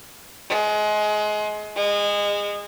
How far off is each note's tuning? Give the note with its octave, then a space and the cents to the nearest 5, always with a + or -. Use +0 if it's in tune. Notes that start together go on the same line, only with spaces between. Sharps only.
G#3 +25
G#3 -25